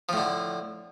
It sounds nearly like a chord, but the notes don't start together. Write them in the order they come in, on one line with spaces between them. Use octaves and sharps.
F3 A2 D3